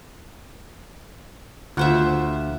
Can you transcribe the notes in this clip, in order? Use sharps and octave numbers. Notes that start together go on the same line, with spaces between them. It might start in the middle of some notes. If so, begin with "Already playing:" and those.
D2 F4 C5 E5 F#5